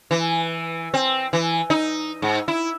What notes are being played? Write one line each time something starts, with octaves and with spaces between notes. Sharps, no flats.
E3
C4
E3
D#4
G#2
E4